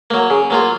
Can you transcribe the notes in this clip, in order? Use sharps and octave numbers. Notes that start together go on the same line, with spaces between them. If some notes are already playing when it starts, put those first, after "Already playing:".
F#3 A#3
C#3
F#3 A#3 F4